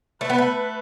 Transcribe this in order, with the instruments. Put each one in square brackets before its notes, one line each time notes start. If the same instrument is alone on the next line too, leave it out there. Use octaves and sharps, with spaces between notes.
[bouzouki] A3 [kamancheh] B4
[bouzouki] B3
A3